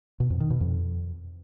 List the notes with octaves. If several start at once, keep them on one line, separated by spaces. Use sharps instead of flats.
B2
F2
D#3
B2
F2